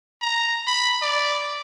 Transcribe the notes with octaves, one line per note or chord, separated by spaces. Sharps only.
A#5
B5
D5